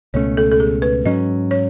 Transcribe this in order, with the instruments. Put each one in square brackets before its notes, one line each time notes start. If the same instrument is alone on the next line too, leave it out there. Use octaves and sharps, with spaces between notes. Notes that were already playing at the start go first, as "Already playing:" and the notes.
[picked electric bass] C#2 B2 A3 C#4 [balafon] C#5
[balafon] A4
A4
G#4
B4
[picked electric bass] G#2 F#3 C#4 [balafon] D#5
[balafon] C#5